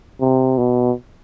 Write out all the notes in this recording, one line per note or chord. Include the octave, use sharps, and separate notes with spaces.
C3
B2